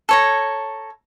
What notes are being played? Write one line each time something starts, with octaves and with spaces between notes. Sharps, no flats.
A4 C#5 A#5